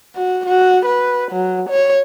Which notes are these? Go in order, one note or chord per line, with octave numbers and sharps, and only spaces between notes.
F#4
F#4
B4
F#3
C#5